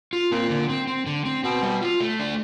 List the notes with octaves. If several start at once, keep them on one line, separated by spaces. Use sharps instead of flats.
F4
A#2 C4
D3
C4
C4
D3
C4
B2 C4
G3
F4
A3
D4